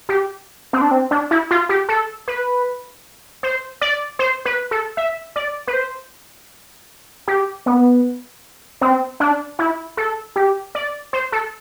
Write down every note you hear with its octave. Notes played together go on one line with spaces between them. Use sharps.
G4
C4
D4
C4
D4
E4
F4
G4
A4
B4
C5
D5
C5
B4
A4
E5
D5
B4
C5
G4
B3
C4
D4
E4
A4
G4
D5
C5
A4